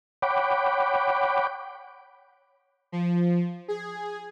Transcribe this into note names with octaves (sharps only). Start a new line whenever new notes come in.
C#5 F#5 G5 B5 D6
F3
G#4